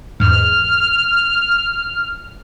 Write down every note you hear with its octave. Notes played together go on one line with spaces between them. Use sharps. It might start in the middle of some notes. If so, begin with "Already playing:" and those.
E2 G#2 F6